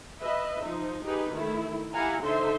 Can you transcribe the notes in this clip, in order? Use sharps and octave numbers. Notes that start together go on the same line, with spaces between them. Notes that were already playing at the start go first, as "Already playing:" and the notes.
B4 D#5 E5
F3 D#4
D#4 G4 G#4 B4
D#3 A3 E4
E4 G4 F5 F#5 G#5 A#5
D3 D#4 A4 C5 E5 C6